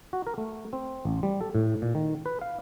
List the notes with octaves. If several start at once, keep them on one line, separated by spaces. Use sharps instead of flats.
F#4
A#4
A3
C4
A1
G3
A4
A2
A#2
D#3
B4
F5